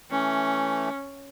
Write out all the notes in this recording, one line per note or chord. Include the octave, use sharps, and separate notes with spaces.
E3 A3 C#4